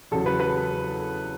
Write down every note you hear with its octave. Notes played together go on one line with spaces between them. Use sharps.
E2 C#3 F#3 A4
B4
B4